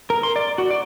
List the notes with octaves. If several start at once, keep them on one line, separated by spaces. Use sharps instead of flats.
A#4
C6
D5
F#4
D5